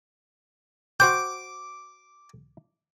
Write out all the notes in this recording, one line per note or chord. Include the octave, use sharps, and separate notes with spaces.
F#4 C5 G5 D6 G6